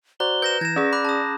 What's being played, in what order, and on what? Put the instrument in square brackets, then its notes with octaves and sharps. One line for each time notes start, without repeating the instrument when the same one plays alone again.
[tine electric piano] F#4 C5 D5 [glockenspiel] A#5 F#6 [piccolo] G7
[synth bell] B4 [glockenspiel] G6 A#6 E7
[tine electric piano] E3 [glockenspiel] G#6 E7 [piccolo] A#6
[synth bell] C#4 G#4 [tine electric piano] D5
[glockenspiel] B5 D6 F#6
A5 D#6